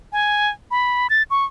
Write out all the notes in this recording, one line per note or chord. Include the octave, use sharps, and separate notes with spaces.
G#5
B5
A6
C#6